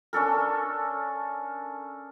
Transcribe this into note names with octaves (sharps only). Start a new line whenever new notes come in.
C#4 D4 A4 A#4